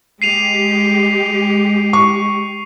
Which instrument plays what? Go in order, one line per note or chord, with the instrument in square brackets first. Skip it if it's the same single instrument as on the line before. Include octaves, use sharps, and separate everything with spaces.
[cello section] G#3 G4 [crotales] C7 D#7 F7
[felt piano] C#6